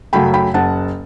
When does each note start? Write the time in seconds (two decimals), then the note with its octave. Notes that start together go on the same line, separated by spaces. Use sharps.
0.13 F#2 C#3 F#3 A3 G5 B5
0.34 G5 B5
0.54 F#1 F#5 A5